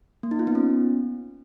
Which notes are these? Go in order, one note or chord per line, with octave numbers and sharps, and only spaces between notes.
A#3
D#4
F4
B3
C#4